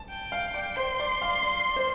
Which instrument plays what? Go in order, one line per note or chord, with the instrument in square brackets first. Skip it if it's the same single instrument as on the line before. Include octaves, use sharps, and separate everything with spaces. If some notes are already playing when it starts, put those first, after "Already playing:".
Already playing: [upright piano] A5
[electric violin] G5
[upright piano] F5
D5
[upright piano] C5 [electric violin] C6
[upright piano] D5
F5
D5
C5